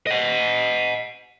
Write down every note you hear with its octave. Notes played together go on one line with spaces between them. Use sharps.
D#5 F#5